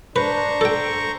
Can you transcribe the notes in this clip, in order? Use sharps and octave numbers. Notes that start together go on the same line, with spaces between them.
D4 B4 C5 A#5 C#6
A4 G5